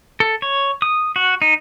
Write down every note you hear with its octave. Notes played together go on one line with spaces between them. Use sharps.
A4
C#5
D#6
F#4
D#4